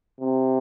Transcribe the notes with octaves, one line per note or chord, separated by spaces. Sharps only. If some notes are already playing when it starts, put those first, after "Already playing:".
C3